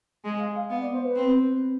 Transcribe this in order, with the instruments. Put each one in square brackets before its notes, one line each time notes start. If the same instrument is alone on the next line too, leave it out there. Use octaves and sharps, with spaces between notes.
[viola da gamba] G#3 [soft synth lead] G#5
[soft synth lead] F5
F5
[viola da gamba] B3 [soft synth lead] F5
[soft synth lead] D5
C5
B4
[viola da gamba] C4